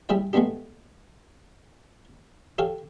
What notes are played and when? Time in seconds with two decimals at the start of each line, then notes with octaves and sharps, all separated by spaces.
0.09 G3 E4 G#4 C#5 G5
0.33 G#3 A3 B3 D4 G4
2.58 G4 A4 C#5 F5